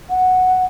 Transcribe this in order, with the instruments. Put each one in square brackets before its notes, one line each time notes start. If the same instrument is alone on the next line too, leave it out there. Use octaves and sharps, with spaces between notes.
[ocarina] F#5